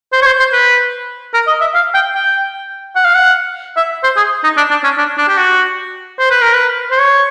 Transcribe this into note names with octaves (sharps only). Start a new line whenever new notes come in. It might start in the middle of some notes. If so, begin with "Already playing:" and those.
C5
C#5
C5
C5
B4
A#4
D#5
E5
F5
G5
G5
F#5
F5
F#5
E5
C5
G#4
D#4
D4
D4
C#4
D4
D4
G4
F#4
C5
B4
A#4
B4
C5
C#5